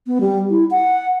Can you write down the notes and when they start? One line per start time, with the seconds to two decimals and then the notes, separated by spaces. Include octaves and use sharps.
0.07 B3
0.21 G3
0.50 E4
0.71 F#5